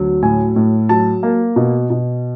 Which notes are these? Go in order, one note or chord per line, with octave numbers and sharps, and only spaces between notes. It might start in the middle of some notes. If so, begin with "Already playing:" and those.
Already playing: D2 F#3
A2 G#5
A2
F#3 A5
A#3
B2
B2